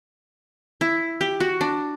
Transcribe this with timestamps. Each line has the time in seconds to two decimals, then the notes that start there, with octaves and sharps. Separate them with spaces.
0.81 E4
1.21 G4
1.40 F#4
1.61 D4